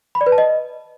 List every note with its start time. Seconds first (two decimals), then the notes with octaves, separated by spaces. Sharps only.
0.15 B5
0.21 D5
0.26 B4
0.32 A5
0.38 D#5